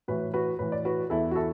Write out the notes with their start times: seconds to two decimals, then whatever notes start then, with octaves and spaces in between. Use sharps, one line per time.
0.08 A2 E3 F#4 B4
0.34 F#4 B4
0.59 A2 E3 B4
0.72 D5
0.85 F#4 B4
1.10 E2 E3 E4 A4
1.31 F#4
1.36 E4 A4